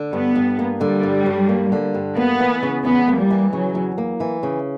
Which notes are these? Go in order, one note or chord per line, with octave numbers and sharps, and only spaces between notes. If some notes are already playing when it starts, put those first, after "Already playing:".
Already playing: D3
G2 B3
G2
A#3
D3 G3
G2
G2
A#3
D3
G2
A#3 B3
E3
C#3
E2 B3
A#3
G3
E3
C#3 F#3
E2
A#3
E3
C#3